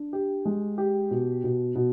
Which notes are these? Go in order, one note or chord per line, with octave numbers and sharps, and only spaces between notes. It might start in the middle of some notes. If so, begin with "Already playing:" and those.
Already playing: D4
G4
G#3
G4
B2
B2
B2